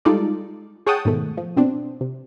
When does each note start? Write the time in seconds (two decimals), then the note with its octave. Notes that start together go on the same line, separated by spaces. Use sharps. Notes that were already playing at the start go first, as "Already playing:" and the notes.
0.05 G3 G#3 D#4 F4 A4 D5
0.87 G#4 C#5 F#5 G5 A5 D#6
1.05 G#2 B2 D#3 A3
1.37 F3
1.57 B2 C4 D4
2.01 C3